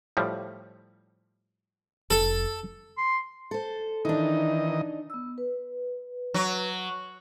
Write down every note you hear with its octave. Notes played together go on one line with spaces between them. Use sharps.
A2 F3 G3
F1 A4
C6
A4 C5
D#3 E3 D4 D#4 D#5
B3 E6
B4
F#3